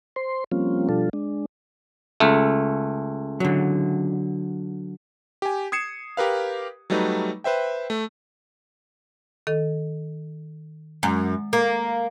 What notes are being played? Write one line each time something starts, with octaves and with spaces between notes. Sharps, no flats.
C5 C6
F3 G3 A#3 C4 C#4 F4
B2 F3 G3 D4 F4 A4
G#3 D4
C#2 A3
D3 F#3
G4 G#5
D#6 G#6 C7 C#7 E7
G4 A#4 B4 F5
F#3 G3 A3 D#4 B4
B4 C5 E5 G5
A3
D#3 A4 D#5
F#2 G#3
A#3